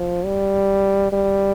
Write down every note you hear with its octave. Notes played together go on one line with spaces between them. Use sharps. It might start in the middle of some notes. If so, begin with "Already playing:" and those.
Already playing: F3
G3
G3